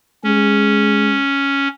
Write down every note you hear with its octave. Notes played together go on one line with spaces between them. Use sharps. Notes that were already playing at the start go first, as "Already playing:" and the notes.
G#3 C#4